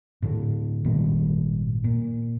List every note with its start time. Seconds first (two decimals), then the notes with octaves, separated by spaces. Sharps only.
0.22 A2 D3
0.85 G#1 A#2 D#3 G3
1.84 A#2